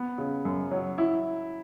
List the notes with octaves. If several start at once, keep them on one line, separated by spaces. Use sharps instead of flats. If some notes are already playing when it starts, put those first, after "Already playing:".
Already playing: B3
C#3
F#2
F#3
E4